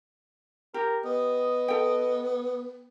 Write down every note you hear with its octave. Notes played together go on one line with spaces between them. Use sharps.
G4 A#4
B3 D#5
A4 G5